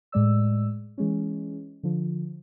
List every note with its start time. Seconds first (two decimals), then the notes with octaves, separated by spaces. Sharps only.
0.12 A2 G#3 D5 E6
0.98 E3 G#3 C#4
1.83 D3 F3